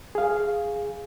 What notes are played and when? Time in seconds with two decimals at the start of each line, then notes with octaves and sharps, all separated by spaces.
0.15 G#4 F5